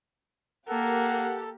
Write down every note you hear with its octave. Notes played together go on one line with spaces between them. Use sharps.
A#3 G4 A4 A#4 F#5